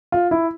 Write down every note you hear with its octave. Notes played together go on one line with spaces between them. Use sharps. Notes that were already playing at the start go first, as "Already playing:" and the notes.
F4
E4